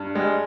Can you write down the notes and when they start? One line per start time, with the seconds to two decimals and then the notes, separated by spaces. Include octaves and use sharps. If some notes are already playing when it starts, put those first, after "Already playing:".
Already playing: G2
0.15 G3 G#3